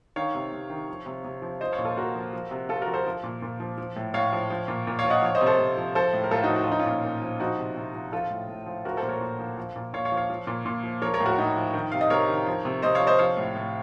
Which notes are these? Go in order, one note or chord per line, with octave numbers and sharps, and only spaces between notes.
D#3 C#5 F5
C3
C3
D#3
F3
C3
C3
F3
F3 C5 D#5
C#5 F5
A#2
F4 A4
A#2 F#4 A#4
F3
F3
C3
C3 F4 A4
F#4 A#4
F3
A4 C5
F3
A#2
A#2
F3
F3
A2
A2 C#5 F5
F3
F3
A#2
A#2
C#5 F5
F3
D#5 F#5
F3 C#5
C5 D#5
C3
A4 C5
C3
F3
F3 A4 C5
A2
A#4
A2 F4 A4
D#4 F#4
F3
F#4
F4
F3 D#4
C#4 F4
A#2
A#2
F3
F3 D#4 F#4
C3
C3
F3
F3 F4 A4
A2
A2
F3
F3 F#4 A#4
A4 C5
A#2
A#4 C#5
A#2
F3
F3
A#2
A#2 C#5 F5
C#5 F5
F3
C#5 F5
F3
A#2
A#2
F3
F3 A#4 C#5
A#4 C#5
A2
F#4 A#4
A2 D#4
F3
D#3
C3 F5
D#5
C3 A#4 C#5
D#3
F3
C3
C3 C5 D#5
C#5 F5
F3
C5 D#5
F3 C#5 F5
A2
A2